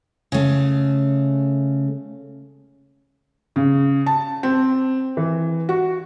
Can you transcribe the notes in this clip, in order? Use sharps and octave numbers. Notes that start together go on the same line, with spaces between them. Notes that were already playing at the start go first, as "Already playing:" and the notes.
C#3 A3
C#3
A5
C4
E3
F#4